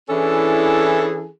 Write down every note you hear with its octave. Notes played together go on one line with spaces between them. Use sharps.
E3 C#4 D4 E4 G#4 A4